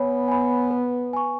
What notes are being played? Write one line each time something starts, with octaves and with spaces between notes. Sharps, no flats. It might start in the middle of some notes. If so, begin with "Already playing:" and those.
Already playing: B3 C#5 G#5 B5
G#5 B5
B4
G#5 C#6